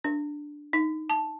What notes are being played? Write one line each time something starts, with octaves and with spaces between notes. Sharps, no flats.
D4
D#4
A5